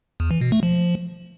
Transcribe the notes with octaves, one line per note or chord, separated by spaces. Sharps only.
E2
E3
B2
A3
F3